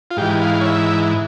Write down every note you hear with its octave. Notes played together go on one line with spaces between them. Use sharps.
F4
G#2 E3 G4
F5
C#5
E5